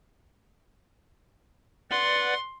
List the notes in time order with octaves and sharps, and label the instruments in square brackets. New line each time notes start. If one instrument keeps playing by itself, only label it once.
[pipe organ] B4 D5 F#5 [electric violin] C6